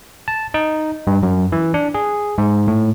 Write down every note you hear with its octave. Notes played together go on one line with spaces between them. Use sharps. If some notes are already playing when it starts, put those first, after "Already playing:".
A5
D#4
G2
F#2
E3
D4
G#4
G#2
A2